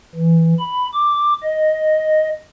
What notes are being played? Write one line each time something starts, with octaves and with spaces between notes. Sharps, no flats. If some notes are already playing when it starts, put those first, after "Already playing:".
E3
B5
D6
D#5